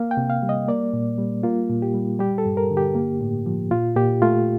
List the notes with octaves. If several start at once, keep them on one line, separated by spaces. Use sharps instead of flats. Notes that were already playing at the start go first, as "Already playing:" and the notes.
Already playing: A#3 F5
G5
C3
F5
G3
D#5
A#3 D5
A#2
G3
A#3 F4
A#2
G4
G3
G3 G4
A4
G2
A#4
D3
G4
A#3
A2
F3
A#2 F4
A#2 G4
A3 F4